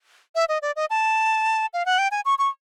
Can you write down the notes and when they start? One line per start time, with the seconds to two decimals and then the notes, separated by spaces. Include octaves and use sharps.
0.35 E5
0.49 D#5
0.62 D5
0.76 D#5
0.90 A5
1.74 F5
1.86 F#5
1.98 G5
2.11 G#5
2.25 C#6
2.39 C#6